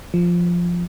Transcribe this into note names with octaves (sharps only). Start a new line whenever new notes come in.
F3